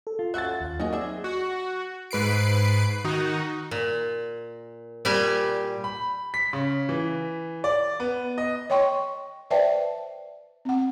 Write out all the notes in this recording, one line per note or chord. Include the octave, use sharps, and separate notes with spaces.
A4
F4
C#4 F#4 E5 F#6 A6
D#2 F5
F#3 A#3 C#4 D#4 F#4 G#4 D#5
C4 G#4 D5 E5 G#5
F#4
G#2 B4 C7 D7
D#3 D#4 F#4
A#2
A#2 G3 G4 G#5
B5
B6
C#3
E3
D5
B3
D#5
C#5 D#5 G5 C6 C#6
B4 C5 D5 E5 G5 A5
C4 F#5